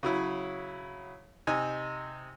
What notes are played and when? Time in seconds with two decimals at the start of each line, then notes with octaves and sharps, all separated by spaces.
0.03 C#3 F#3 E4
1.47 C3 D#4 G#5